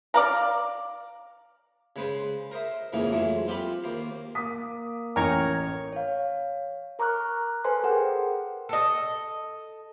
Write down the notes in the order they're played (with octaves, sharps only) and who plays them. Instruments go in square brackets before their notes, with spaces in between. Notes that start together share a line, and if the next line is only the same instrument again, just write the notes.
[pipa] D5 F5 A#5
[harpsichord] C#3 G#3 B4 C5
A#4 C5 D#5 E5
F2 G#2 C#3 E3 A#3 D#4
F2 E3 F#3 G#3 A3
C4 F4 G4 B5
D#2 A#3 C5
[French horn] A#3 [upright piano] D6 D#6 B6
[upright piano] A1 [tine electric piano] A#4 C#5 C#6 [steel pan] G5 G#5 A#5
[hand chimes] C#5 F5
A#4 A#5 C#6 D6 F6 F#6
A4 B4 C5 G#5 C6
G#4 A#4 F#5 G5
[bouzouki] A4 D#5